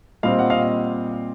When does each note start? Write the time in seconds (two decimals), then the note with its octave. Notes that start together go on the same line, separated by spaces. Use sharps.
0.23 A#2 G3 C4 D#5 F5
0.39 F#5
0.50 D#5 F5